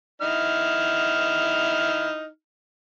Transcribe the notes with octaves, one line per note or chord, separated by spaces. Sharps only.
D#4 E4 F6